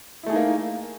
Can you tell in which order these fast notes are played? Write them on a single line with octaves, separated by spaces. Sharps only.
E4 A3 G#4 D#4 A#3